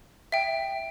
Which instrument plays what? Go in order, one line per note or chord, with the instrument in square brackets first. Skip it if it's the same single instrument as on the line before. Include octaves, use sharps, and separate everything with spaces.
[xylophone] E5 G5